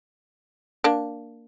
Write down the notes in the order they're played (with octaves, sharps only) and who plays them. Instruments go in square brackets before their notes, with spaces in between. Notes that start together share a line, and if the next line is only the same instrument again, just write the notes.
[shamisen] A#3 D4